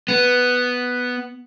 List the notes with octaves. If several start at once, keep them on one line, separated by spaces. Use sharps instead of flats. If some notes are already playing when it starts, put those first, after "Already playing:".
B3